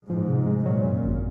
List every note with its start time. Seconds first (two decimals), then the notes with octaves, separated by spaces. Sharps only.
0.10 G#2 F3
0.28 C3
0.46 G#3
0.66 A#2 F#3
0.85 F#2
1.03 G#1